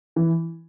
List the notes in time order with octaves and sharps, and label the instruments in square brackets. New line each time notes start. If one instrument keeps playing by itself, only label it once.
[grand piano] E3